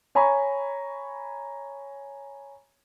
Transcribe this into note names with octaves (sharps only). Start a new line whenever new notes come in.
C#5 G#5 A#5 B5 C#6